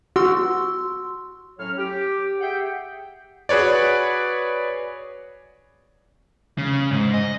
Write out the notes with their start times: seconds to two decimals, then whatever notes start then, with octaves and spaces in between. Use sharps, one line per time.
0.16 F#4 C6 E6
1.59 A2 F#3 C#4 C#5 F6
1.78 G4
2.40 G4 G#4 E5 F#5 G5
3.49 F#4 G#4 B4 C#5 D5
6.58 C#3
6.91 G#2
7.14 D#5